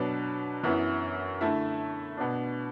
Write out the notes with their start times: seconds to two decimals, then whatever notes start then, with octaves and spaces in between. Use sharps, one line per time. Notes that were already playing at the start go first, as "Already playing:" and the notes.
Already playing: B2 F#3 D4 B4
0.63 F#2 E3 B3 E4
1.41 D3 A3 E4
2.17 B2 B3 D4